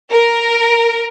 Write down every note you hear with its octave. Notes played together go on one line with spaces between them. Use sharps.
A#4